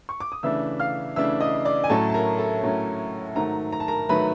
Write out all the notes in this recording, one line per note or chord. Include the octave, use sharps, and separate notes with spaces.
C#6
D6
D#6
C#3 E3 A3 D4 E5 E6
F5 F6
C#3 E3 A3 D4 E5 E6
D#5 D#6
D5 D6
G#5
A2 F#3 A3 C#4 A4 A5
A5
A#4 A#5
A4 A5
A2 F#3 A3 C#4
G#2 D#3 F#3 A3 A#4 A#5
A#5
A5
A#4 A#5
D#3 F#3 A3 B4 B5